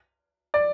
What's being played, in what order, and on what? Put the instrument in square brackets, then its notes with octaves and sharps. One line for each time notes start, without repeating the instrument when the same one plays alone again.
[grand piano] D5